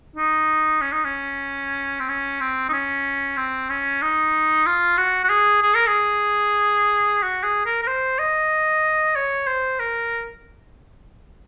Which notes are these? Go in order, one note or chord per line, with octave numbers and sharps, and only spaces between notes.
D#4
C#4
D#4
C#4
C4
C#4
C4
D#4
C#4
C4
C#4
D#4
F4
F#4
F#4
G#4
G#4
A#4
G#4
F#4
G#4
A#4
A#4
C5
D#5
C#5
C5
A#4